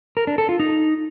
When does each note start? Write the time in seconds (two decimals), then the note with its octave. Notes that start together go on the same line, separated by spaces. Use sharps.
0.17 A#4
0.27 D4
0.38 A4
0.49 F4
0.60 D#4